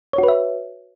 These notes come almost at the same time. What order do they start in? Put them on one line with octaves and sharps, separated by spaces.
C#5 F#4 B4 E5